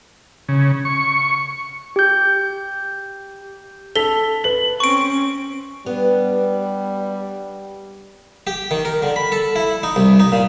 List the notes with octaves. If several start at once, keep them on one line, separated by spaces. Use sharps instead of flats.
C#3
C#6
G4 G6
A4 B6 F7 G7
B4 F#7
C4 C#4 C#6 D7
G3 B3 D4
G4
D#3
A#4
D3
B5
A4
E4
D#4
C2
D#4
A#2